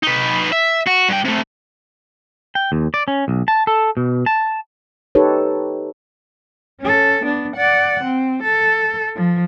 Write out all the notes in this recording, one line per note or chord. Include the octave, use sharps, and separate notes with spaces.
D#4 B4
E5
F#4
G2 G5
C3 A3
G5
D#2
D5
C#4
B1
A5
A4
B2
A5
D#4 G4 A4 B4 C#5
C#4 A4
B3 D4
D5 F#5
C4
A4
F3